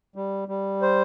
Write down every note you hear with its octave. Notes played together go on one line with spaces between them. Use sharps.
G3
G3
C5